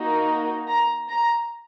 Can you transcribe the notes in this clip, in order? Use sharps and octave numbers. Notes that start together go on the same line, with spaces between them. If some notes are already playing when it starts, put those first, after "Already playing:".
Already playing: A#3 D#4 F#4
A#5
A#5